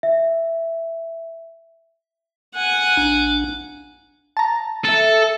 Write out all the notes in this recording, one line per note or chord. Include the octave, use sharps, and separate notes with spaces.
E5
F#5 G#5
A#1 D4
A5 A#5
A4 E5 C#7